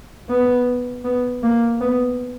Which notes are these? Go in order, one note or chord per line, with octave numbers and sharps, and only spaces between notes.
B3
B3
A#3
B3